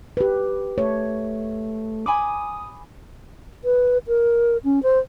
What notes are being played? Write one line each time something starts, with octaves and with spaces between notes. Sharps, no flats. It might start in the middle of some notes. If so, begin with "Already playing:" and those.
G4 B4
A3 C#5
G#5 B5 D6 D#6
B4
A#4
C#4
C5